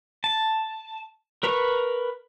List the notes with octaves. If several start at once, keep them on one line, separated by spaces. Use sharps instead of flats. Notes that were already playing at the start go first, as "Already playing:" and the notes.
A5
A#4 B4 A#5 C#6